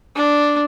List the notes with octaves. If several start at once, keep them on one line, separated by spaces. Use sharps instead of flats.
D4